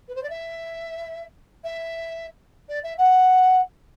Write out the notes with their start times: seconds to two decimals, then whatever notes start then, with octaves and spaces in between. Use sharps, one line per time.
0.08 B4
0.15 C5
0.23 D5
0.30 E5
1.64 E5
2.69 D5
2.83 E5
2.98 F#5